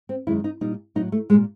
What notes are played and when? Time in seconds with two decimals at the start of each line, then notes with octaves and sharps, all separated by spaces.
0.09 C4
0.27 F#2 D#3 G#3 E4
0.44 D#4
0.61 A#2 G3 D#4
0.95 A2 F#3 D#4
1.12 A3
1.30 A#2 G3 G#3